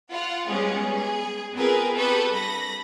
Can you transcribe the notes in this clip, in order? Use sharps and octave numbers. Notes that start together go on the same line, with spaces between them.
F4 F#5
G3 G#3 B3 C#4 G#4
G#4
B3 C4 F4 G#4 A#4 B4
G4 A4 B4 C#6 D#6 F#6
G2 B5 A#6